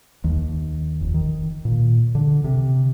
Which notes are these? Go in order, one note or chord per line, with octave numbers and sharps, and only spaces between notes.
D#2
F1
D#3
A#2
D3
C3